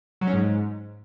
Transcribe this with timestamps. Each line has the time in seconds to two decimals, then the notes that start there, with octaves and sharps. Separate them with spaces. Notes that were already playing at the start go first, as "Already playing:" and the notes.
0.21 F#3
0.27 C#4
0.33 G#2